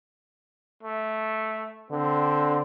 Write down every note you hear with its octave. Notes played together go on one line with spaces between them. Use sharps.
A3
D3 C4